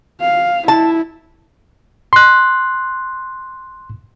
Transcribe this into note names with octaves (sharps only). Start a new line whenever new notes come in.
F5
E4 A5
C6 F#6